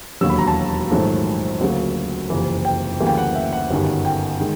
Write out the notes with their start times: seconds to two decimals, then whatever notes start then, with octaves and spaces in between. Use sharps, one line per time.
0.21 E1 D#2 D3 F#3 E6
0.30 B5
0.38 A#5
0.47 A5
0.91 A#1 G#2 D#3 F#3 A3
1.61 D2 C#3 F#3 A#3
2.30 F#1 F2 C3 E3
2.65 G5
3.00 D2 C#3 E3 G3 A#3
3.07 G5
3.17 F#5
3.35 E5
3.53 F#5
3.70 G1 F#2 D#3 G3
4.05 G5
4.40 D#3 G#3